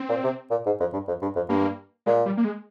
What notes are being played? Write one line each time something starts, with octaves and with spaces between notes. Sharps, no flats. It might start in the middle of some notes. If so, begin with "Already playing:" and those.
Already playing: C4
A#2
C3
A#2
G#2
F2
G2
F2
G2
F2
G2 A#3
A#2 G#3
G3
A#3
G#3